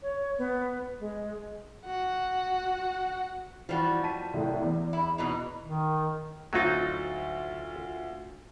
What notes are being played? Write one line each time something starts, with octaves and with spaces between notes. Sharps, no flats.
C#5
B3
G#3
F#4 F#5
E3 F3 G3 F#4
A5 B6 D#7
C2 A2
E2
E4
B2 E3 D#4
D#3
D2 F#3 C4 D#4 F4 A6